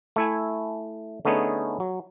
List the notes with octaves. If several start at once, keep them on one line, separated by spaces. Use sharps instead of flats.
A3 E4 G#5
D3 A3 B3 C#4 D#4 G#4
F#3